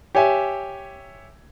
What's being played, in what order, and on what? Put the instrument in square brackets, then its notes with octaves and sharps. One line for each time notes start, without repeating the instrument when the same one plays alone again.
[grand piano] G4 C#5 E5 G#5